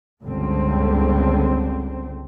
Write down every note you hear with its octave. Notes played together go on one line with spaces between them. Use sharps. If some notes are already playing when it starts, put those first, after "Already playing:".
G1 C#2 D3 C4